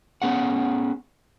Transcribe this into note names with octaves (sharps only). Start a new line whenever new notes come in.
B3 C#4 G#4 F#5